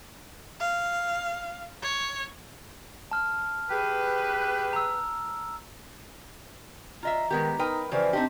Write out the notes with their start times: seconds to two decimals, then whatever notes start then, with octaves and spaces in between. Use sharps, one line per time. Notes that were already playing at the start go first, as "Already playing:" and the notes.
0.60 F5
1.82 C#5
3.11 A5 F6
3.69 G4 G#4 B4
4.73 A#5 E6
7.03 F4 D#5 E5 A#5
7.31 D#3 G#3 B3 G4
7.59 D#4 A#4 B4 G5
7.91 C#3 E3 F3 G4 C5 D5 E5
8.13 C4 D4 D#4 G4 A5 C6